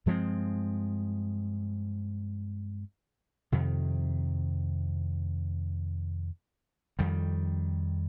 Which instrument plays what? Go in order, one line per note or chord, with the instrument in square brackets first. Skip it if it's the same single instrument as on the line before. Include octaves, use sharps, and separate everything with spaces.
[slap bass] G2 F3 G#3 C4
F2 C3 D#3
F2 D#3 G3